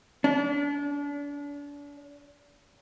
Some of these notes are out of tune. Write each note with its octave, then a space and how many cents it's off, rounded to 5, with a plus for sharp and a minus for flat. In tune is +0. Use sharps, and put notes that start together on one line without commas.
D4 -35